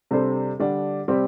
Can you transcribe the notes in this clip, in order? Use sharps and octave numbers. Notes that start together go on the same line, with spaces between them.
C3 G3 D4 A4 C5
D3 G3 D4
C3 G3 C4 G4